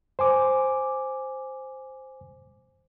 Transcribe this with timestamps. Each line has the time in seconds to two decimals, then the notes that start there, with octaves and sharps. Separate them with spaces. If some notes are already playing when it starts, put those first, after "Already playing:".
0.19 C5 G#5 D6